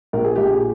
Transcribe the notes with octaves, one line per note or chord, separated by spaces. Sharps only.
A#1 A#4
G#4
A#1 G4
G#4